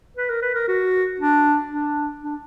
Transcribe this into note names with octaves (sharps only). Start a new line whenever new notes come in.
B4
A#4
B4
A#4
F#4
D4
D4
D4